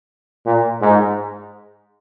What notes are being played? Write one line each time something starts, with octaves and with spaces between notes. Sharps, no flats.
A#2
G#2